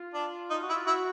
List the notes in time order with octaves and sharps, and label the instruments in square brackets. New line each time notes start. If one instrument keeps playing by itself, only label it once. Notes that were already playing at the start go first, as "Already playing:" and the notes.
Already playing: [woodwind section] F4
[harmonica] D4
D#4
[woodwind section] F#4
[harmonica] E4
[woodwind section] F4
[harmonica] E4 [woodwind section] F#4